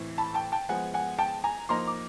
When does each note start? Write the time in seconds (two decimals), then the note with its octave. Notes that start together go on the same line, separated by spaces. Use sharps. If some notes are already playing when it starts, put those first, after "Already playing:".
Already playing: A2 E3 A3 C4
0.18 A5 B5
0.34 G5 A5
0.52 G5 A5
0.69 F3 G#3 B3 F#5 G#5
0.94 F#5 G#5
1.19 G5 A5
1.44 G#5 A#5
1.69 F3 A#3 D#4 A#5 C6
1.87 D6